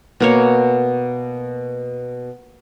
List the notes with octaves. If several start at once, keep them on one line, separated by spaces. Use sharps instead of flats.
B2 A#3 C#5